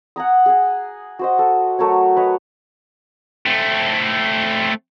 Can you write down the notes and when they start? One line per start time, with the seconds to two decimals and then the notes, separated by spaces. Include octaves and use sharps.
0.16 F#5 G#5 A#5 D#6
0.46 G#4 G#5
1.19 F#4 C5 D#5
1.39 A4
1.79 F#3 A3 A#4 C#5
2.16 B4 C#5 D#5
3.46 A3 C4